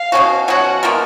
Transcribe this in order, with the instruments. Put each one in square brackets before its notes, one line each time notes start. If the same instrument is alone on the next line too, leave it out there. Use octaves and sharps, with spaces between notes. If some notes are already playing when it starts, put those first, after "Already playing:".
Already playing: [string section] F5
[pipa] B2 F#3 C#4 F#4
[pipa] B2 F#3 C#4 F#4 [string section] F#5
[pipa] B2 A#3 F4 A#4